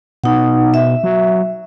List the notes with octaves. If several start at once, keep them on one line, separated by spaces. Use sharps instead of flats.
B2 D#4 F#5
E5
F#3